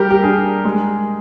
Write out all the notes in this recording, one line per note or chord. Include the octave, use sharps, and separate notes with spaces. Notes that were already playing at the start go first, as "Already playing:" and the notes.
Already playing: G3 G4 A#4
G4
D4 G#4
G#3